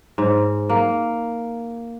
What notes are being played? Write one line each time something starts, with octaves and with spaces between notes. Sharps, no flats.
G#2
A#3